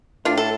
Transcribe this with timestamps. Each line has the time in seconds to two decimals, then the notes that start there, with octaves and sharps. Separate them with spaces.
0.25 A2 D4 F4
0.38 A4